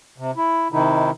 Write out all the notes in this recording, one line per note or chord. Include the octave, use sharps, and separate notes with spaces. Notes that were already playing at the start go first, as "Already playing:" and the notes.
C3
E4
C3 D#3 D#4 E4